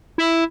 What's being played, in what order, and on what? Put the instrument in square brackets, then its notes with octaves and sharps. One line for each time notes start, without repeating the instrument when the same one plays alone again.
[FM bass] E4